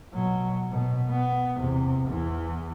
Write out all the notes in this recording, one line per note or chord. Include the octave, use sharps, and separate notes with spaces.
B2 F#3
B2
B3
E2 C3
E2 E3